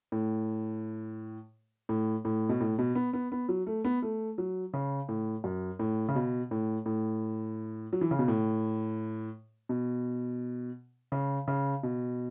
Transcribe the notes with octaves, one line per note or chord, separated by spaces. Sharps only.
A2
A2
A2
B2
A2
B2
B3
B3
B3
F#3
A3
B3
A3
F#3
C#3
A2
F#2
A2
C#3
B2
A2
A2
F#3
E3
C#3
B2
A2
B2
C#3
C#3
B2